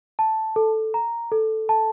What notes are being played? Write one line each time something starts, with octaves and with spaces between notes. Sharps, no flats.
A5
A4
A#5
A4
A5